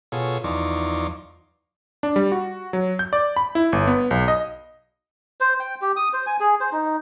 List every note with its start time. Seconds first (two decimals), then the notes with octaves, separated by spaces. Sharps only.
0.12 B2 F4 G#4 A4 C#5
0.44 E2 F3 D#4 D5 C6 C#6
2.03 D4
2.16 G3
2.32 F#4
2.73 F#3
2.99 G6
3.13 D5
3.36 B5
3.55 E4
3.72 G1
3.88 B3
4.11 B1
4.28 D#5
5.40 C5
5.60 G5
5.82 G4
5.96 D#6
6.13 C5
6.27 G#5
6.40 G#4
6.61 C5
6.72 D#4